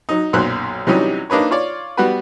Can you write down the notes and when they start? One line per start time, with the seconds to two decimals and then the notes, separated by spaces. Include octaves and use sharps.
0.09 F#3 D#4
0.33 B1 F#2 A#2 C5 F#6
0.87 C3 E3 F#3 G3 C#4 D#4
1.30 A#3 D4 D#4 B4 C#5
1.51 F4 C#5 D5
1.97 G3 B3 F#4 B4